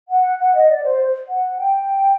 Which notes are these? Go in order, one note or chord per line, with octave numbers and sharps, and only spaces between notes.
F#5
F#5
D#5
D5
C5
F#5
G5